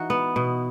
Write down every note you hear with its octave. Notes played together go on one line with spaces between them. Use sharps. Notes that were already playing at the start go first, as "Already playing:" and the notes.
Already playing: E3 D#4 F#4
B3
B2